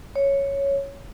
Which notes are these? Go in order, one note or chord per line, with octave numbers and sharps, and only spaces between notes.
C#5